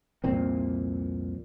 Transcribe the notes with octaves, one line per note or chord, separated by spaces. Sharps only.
C2 F2 A#2 C4